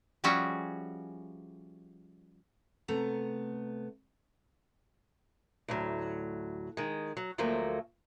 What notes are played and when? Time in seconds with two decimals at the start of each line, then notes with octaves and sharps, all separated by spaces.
0.24 F3 G3 C#4 F#4 G#4 E5
2.88 C3 A3 B3 A#5
5.68 D2 A2 F#3
6.77 D#3 G#3
7.17 F#3
7.38 D2 F3 F#3 A3 A#3